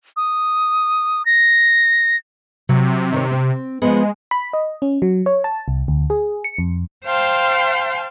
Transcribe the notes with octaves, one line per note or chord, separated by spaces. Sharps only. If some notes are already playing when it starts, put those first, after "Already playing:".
D#6
A#6
C3 F#3
D#3 A#4 C#5
C4
F3 G#3 B3
B5
D#5
C#4
F#3
C#5
A5
C2
D2
G#4
C#7
F2
C5 F5 G5 A5 C6